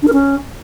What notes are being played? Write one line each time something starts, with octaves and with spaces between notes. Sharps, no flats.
D4
A#4
C#4